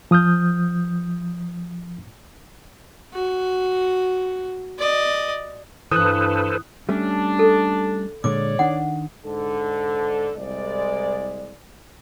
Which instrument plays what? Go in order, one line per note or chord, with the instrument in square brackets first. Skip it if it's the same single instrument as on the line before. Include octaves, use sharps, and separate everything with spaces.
[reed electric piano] F3 D#6 F6 G6
[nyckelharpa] F#4
D5 D#5
[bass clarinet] G2 [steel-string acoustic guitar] E3 [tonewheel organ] A4 B4 C5 [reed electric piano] D#6 F#6
[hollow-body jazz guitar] G3 A3 C#4 [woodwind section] D4
[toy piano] A4
[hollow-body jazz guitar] A#2 D3 G#3 [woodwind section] C#5 D5 [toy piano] D6
[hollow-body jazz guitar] D#3 D4 [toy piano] F#5
[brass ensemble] G#2 D3 A4
C2 G#3 D5